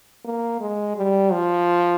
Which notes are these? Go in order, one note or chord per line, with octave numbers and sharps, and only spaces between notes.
A#3
G#3
G3
F3